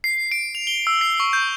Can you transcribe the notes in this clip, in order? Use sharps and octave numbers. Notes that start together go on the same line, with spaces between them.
C7
D7
F7
G7
E6
C7
C#6
G6